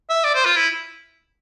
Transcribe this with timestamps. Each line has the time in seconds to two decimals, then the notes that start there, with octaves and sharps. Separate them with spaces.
0.09 E5
0.24 D5
0.35 C5
0.45 F4
0.56 E4